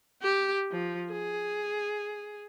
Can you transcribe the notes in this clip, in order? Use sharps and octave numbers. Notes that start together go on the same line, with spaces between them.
G4
F3
G#4